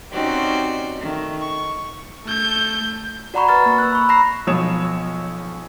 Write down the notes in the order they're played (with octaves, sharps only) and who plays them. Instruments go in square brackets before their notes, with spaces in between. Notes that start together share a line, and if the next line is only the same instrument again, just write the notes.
[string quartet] C4 C#4 D#4 F#4 G4 D5
D#3 A3
C#6
[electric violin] A3 G6
[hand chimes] F#4 D5 F#5 A#5 B5 C#6
B4 C#6 F6 A6
A#3
E6 F#6
B5 C#6
A#5 B5 A#6 C7
[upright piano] B1 F3 C#5 D#6 E7